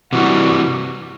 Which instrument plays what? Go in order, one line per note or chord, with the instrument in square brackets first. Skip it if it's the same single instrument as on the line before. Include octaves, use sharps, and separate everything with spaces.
[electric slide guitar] C3 E3 G3 [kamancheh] F#4